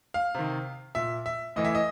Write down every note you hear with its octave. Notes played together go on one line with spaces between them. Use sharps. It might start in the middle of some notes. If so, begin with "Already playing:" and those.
F5
C3 D#3
A#2 E5
E5
A2 E3 D#5
E5
D#5